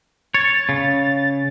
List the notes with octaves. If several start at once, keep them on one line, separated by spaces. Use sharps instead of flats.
C#5 A6
C#3